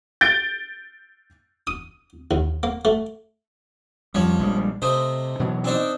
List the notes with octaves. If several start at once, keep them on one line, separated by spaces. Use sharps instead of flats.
G6 A6 D7
D#6
D#2
A#3
A3
F2 F3 G3 C#5
A#1 G3 G#3
C3 A3 C5 D#5
B2 E3 F#3
C4 D4 D#4